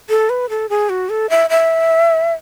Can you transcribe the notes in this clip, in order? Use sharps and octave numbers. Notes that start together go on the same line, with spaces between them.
A4
B4
A4
G#4
F#4
A4
E5
E5